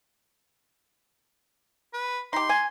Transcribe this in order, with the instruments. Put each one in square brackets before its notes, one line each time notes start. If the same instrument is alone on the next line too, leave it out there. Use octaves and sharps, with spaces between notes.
[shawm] B4
[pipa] D#4 G4 [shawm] C6
[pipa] G#5